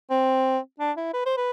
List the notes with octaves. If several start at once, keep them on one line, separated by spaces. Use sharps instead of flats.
C4
D4
E4
B4
C5
B4